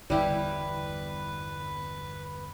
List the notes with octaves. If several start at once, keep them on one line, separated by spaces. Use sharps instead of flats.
G1 E2 G3 E4 G4 B4